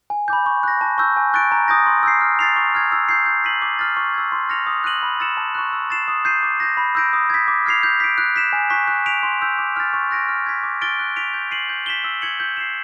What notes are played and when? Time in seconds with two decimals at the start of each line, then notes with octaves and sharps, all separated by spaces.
0.10 G#5
0.28 B5 D6 G6
0.46 C#6
0.63 F#6 A#6
0.81 A5
0.98 C#6 E6 G6
1.17 G#5
1.34 C#6 F#6 A6 D7
1.52 A#5
1.68 D#6 G6 A#6
1.86 C6
2.03 E6 G6 C7
2.21 F6
2.39 A6 C7 F7
2.56 C#6
2.75 F6 G#6
2.92 E6
3.08 G6 C7
3.26 G6
3.44 B6 D#7 F#7
3.62 D6
3.79 F6 A6
3.97 C#6
4.14 E6 G#6
4.32 C6
4.49 F6 A#6 C#7 F7
4.66 D#6
4.84 F#6 A#6 D#7 F#7
5.03 B5
5.20 E6 A6 C#7 E7
5.37 A5
5.55 C#6 F#6
5.73 E6
5.90 A6 C7 E7
6.08 D#6
6.25 G6 C7 D#7
6.43 D6
6.60 G6 A#6
6.77 B5
6.95 E6 G6 A#6 D7
7.13 D#6
7.30 G#6 B6
7.48 D6
7.66 F6 G#6 C7 F7
7.83 G6
8.00 B6 D7
8.18 F#6
8.36 B6 E7
8.53 G#5
8.70 C#6 F#6 B6
8.88 F#6
9.06 B6 D7 F7
9.23 C6
9.42 E6 G6
9.59 D6
9.76 F6 A6
9.94 C#6
10.11 F#6 A#6 D7
10.29 F6
10.46 G#6 B6
10.64 D6
10.81 F6 A6 D7 G7
10.99 F#6
11.16 B6 D7 F7
11.34 G6
11.51 C7 D#7 F#7
11.69 G6
11.86 B6 E7 G7
12.04 E6
12.22 G#6 C#7 F#7
12.40 G6
12.57 C7 E7